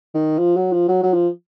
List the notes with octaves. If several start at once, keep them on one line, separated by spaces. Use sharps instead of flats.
D#3
F3
F#3
F3
F#3
F#3
F3